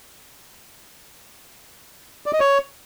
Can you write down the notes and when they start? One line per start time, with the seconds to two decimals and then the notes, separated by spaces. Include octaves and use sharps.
2.26 D5
2.33 D#5
2.40 C#5